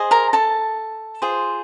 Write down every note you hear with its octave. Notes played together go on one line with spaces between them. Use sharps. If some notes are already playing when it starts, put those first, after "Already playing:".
Already playing: G#4 C5 D#5
A#4 A#5
A4 A5
F4 G#4 C5